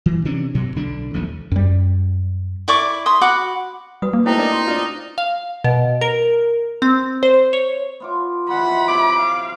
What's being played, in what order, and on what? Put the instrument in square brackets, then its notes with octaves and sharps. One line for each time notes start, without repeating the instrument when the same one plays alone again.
[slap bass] E3
C3 E3 C#4 D4
G2 B2 F#3
B1 D3 D4
A1 D#2 F3 A3
[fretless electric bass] F#2 G3
[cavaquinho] E4 D5 C#6 D6
E5 C6 D#6
F#4 F#5 B5 D6
[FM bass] G3 [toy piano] F#4 B4 D#6
[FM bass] A#3
[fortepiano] A3 B3 [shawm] D#4 [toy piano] E4 C5 G5
[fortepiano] D4 A#4 D#5
C6
D4 F4
[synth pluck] F5
B2
A#4
C4
C5
C#5
[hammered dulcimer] B3 F4 D6
[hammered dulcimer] B2 E3 F3 [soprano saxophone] F#5 [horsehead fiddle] B5
[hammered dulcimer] C3 F#3 [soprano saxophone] D6
[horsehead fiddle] F5